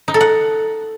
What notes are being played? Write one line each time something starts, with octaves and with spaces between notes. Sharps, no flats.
D#4
A4
F#5